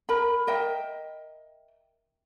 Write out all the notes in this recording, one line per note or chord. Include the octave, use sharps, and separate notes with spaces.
A#4 B5
A#4 D#5 E5 G5